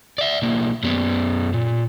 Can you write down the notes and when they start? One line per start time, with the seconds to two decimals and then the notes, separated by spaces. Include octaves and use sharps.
0.18 D5 E5
0.42 B1 A#3
0.83 F#2 B3
1.54 A#2